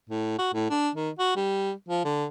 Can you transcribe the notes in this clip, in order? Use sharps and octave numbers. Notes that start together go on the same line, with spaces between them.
A2
F#4
A2
D4
D#3
F#4
G3
F3
D3